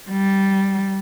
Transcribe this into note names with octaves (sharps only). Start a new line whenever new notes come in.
G3